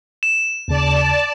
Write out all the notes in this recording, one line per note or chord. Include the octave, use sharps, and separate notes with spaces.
E7
D#2 C#3 D5 A5